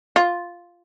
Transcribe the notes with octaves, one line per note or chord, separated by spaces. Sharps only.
F4